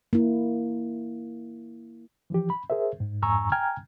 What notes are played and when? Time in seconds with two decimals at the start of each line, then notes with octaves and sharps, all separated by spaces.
0.13 A#3 E4
2.30 E3 F3 G4
2.50 B5
2.70 G#4 A#4 C5 E5
3.00 G#2
3.22 F2 G#2 G#5 A#5 C#6 E6
3.52 G5 G#5 A#5 F6 G#6